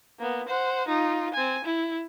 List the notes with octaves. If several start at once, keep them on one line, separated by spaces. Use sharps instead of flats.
A#3 B3
C5 F#5
D#4 F4
C4 G#5
E4